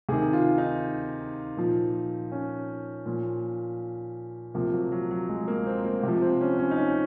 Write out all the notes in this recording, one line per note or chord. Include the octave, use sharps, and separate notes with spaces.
C3 D#3 G#4
F4
D#4
A#2 F3
C#4
A#2 F3
C3 F3 A#3
F#3
F#3
F#3
G#3
A#3
C4
A#3
C3 F3
C4
C#4
C#4
D#4
C#4